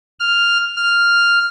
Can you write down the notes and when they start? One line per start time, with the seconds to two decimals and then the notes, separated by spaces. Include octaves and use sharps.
0.20 F6
0.76 F6